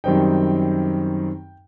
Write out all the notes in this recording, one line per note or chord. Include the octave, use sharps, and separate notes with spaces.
F#2 D#3 G3 C4 D#4 G5